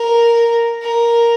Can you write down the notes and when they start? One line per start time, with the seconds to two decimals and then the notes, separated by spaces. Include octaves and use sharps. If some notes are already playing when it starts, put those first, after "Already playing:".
Already playing: A#4
0.82 A#4